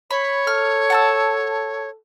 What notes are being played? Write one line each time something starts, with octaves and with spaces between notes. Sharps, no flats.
C#5 B5
A4 F6
F#5 A5 E6